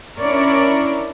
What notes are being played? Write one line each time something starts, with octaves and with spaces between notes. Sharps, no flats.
C#4 D4 E4 A#4 C#5 D5